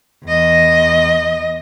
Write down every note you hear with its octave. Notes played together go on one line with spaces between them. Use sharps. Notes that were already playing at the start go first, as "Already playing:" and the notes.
E2 D#5